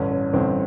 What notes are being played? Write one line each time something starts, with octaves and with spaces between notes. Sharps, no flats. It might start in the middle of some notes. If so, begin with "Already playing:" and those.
Already playing: A1 G2 D3 C#4
C#4
A1 G2 D3 C4